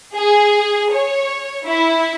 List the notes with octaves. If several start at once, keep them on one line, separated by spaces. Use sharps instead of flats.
G#4
C#5
E4